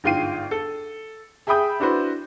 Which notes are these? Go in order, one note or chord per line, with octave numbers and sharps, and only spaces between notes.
G1 G#2 F4 G5 C7 D#7
A4
G#4 E5 G5 B5 D#6 G6
D4 E4 F#4 B4 C5